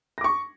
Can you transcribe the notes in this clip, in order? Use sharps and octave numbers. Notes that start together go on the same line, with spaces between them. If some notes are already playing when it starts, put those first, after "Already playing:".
C#6 D6 A#6